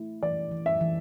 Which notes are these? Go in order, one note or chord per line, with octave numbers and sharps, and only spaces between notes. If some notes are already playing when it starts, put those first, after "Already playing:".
Already playing: A3 E4
E3 D5
E3
E5
E3